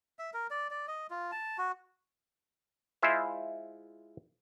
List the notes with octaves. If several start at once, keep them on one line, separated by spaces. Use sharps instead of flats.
E5
A#4
D5
D5
D#5
F4
A5
F#4
G#3 E4 F4 C5 E5